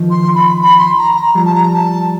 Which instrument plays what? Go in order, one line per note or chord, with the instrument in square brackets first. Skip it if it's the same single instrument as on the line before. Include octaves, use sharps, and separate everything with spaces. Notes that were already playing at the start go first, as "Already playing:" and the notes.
Already playing: [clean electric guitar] D#3 F3
[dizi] C6
B5
B5
C6
A#5
A#5
[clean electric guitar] F3 G3 [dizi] A#5
[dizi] A5
A#5
A5